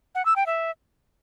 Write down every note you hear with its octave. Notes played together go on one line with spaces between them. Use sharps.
F#5
E6
G5
E5